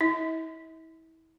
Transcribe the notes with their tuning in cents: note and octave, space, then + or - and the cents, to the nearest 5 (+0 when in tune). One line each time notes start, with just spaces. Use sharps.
E4 -30 E5 -45